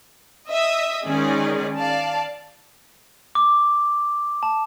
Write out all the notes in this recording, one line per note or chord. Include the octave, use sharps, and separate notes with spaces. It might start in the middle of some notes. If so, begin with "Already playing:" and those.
D#5 E5 D#6
D#3 G#3 C#4 D#4 G#4 D5
D5 F5 A5
D6
A5